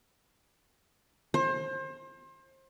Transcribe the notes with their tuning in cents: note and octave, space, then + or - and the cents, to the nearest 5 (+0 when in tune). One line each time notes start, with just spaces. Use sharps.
C5 +30